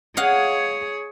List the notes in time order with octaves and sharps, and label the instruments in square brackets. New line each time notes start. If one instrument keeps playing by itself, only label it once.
[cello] G#4 C#5 [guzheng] D#5 F5 F#5